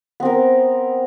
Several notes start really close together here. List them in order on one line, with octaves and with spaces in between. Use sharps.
B3 C4 A#4